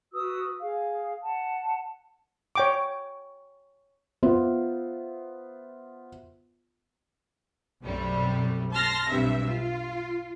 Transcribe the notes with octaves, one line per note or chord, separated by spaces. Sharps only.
F#4 B4 D#6 E6
G#4 F5
F#5 A5
C#5 G5 D6
B3 F4 C5 E5
B1 F#2 C3 G3 A3
A5 C6 F6 A#6
B1 G2 C4 E5
F4